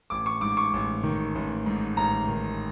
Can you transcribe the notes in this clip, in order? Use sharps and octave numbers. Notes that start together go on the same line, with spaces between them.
A1 D6
C#6
G#2 D6
C#6
A1
D#3
A1
G#2
A1 A#5
D#3